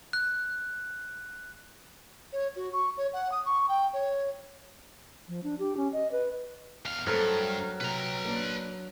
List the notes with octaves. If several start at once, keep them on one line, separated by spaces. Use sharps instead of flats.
F#6
C#5
F#4
C#6
C#5
F#5
D#6
C#6
G5
C#5
F3
D4
G4
C#4
D#5
B4
E2 F5
G2 F#3 A3 A4 A#4 C5
C3 B4 A#5
A#3 D4